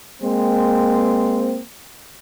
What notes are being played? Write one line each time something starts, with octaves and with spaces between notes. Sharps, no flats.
G#3 A#3 C4